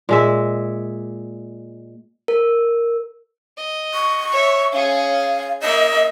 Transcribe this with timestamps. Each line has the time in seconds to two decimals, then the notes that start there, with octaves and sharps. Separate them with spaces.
0.09 A#2 G#3 E5
2.28 A#4
3.57 D#5
3.94 C#6
4.31 C#5 E5
4.72 C#4 G#4 F5
5.62 A#3 D#5 E5